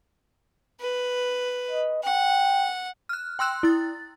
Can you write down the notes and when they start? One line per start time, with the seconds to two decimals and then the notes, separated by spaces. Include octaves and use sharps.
0.80 B4
1.71 D#5
2.04 F#5 G5
3.09 F6 F#6
3.39 G5 C6 E6 F#6
3.63 E4 A6